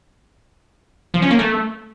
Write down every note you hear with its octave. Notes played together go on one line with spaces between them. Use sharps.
F3
C#4
A#3
A3